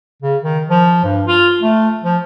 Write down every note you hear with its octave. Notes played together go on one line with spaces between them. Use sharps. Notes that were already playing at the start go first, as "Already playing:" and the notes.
C#3
D#3
F3
G2
F4
A3
F3